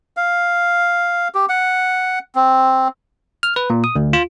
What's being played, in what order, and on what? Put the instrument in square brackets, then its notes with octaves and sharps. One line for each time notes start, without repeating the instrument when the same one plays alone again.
[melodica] F5
G4
F#5
C4
[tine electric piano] F6
B4
A#2
D#6
D2
F4